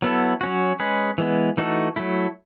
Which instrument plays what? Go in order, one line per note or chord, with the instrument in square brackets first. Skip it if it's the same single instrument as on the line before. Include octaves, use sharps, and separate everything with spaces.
[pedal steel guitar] F#3 B3 E4 A4
F#3 C#4 F#4
G#3 C#4 G#4 B4
E3 G#3 B3
E3 A3 D#4 F#4 A4
F#3 A3 E4